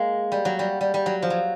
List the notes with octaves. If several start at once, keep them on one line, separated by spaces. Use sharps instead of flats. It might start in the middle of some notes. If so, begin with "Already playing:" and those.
Already playing: G#3 A#3
G3
F#3
G3
G3
G3
F#3
F3
F#3